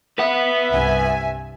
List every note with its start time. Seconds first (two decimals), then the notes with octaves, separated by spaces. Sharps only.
0.18 B4 E5 F#5
0.70 C2 G2 G#5